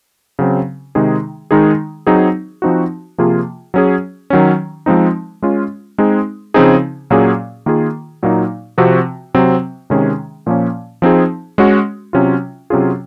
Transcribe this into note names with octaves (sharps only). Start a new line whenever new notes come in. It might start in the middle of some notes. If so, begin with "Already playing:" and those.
C#3 F#3 C4
C3 D#3 G#3 D#4 G#4
D#3 G#3 D#4 G#4
F#3 C4 D#4 G#4
F3 C4 D#4 F#4
C3 F3 A#3 F4 G#4
F#3 C#4 G#4
D#3 F#3 C#4
F3 G#3 C4 D#4
G#3 C#4 F4
G#3 C4 D#4 G#4
C#3 F3 C4 D#4 G#4
A#2 F#3 A#3 C#4 G#4
D#3 A#3 F4 G#4
A#2 F#3 A#3 D#4
C3 F3 C4 F#4
C3 F#3 C4
C3 D#3 G#3 C#4 G#4
A#2 F3 A#3 C#4
F3 C4 D#4 G#4
G#3 C#4 F#4
C3 F#3 C#4 F4
C3 F#3 C#4 F4 G#4